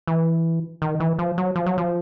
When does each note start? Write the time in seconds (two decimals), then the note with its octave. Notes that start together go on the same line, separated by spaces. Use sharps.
0.07 E3
0.82 D#3
1.00 E3
1.19 F3
1.38 F#3
1.56 F3
1.66 F#3
1.78 F3